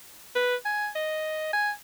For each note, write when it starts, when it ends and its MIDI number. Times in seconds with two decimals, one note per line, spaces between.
0.35 0.55 71
0.65 0.89 80
0.95 1.51 75
1.53 1.71 80